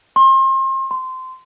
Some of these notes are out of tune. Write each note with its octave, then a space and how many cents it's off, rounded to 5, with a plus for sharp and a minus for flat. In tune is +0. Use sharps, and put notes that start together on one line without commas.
C6 +35
C6 -20